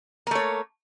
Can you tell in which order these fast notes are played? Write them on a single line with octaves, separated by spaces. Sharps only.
A#3 A3 C#5